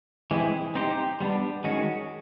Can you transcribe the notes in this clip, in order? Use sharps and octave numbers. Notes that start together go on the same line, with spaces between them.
E3 G#3 C4 E4 G#4
C4 D#4 G4 C5
G3 B3 D4
D#3 G#3 C#4 F#4